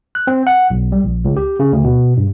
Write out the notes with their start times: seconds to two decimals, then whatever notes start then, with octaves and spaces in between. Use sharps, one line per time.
0.15 F#6
0.27 C4
0.47 F#5
0.70 B1
0.92 G3
1.04 A#1
1.25 C#2
1.37 G4
1.60 C#3
1.73 D2
1.84 B2
2.17 G2